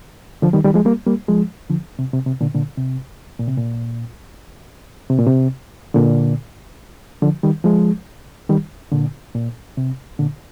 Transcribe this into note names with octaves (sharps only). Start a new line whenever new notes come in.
D3 F3
D#3 G3
D#3 G3
F3 G#3
G3 A#3
G3 A#3
F3 G#3
D3 F3
C3
C3
C3
A#2 D3
A#2 D3
C3
A#2
C3
A#2
C3
A#2
C3
A#2 D3
D3 F3
D#3 G3
F3 G#3
D#3 G3
A#2 D3
A#2
C3
A#2 D3